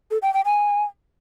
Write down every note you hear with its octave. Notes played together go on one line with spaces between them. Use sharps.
A4
G5
G5
G#5